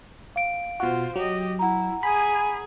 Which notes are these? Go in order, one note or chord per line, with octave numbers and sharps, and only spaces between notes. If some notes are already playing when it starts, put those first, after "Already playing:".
F5 D7
B2 F4 F#4 C5
F#3 G4 D#5
E4 F#5 A#5
G#4 G#5 B5